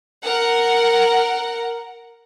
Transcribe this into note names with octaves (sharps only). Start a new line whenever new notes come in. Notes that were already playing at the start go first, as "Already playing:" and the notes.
A#4 F#5